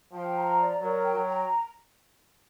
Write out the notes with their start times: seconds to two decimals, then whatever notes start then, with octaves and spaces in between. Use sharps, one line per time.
0.13 F3 G5
0.35 A#5
0.58 D5
0.80 F#3 A#4
1.03 G5
1.14 F#3
1.26 A#5